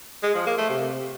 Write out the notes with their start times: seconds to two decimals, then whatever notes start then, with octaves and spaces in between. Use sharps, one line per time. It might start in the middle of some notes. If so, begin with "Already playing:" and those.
0.23 G#3
0.35 F3
0.46 A#3
0.58 A3
0.69 C3